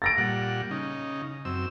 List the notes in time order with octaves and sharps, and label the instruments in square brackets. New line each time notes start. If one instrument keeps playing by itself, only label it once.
[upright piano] A6 A#6 D7
[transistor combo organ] A#2 G3 F#5
C#3 D#4
F#2 C4 E6